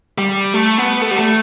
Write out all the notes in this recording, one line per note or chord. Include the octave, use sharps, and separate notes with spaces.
G3
A3
B3
A3
G3
A3